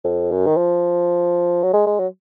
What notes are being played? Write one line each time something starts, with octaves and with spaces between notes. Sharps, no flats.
F2
F#2
D#3
F3
F#3
G#3
G#3
F#3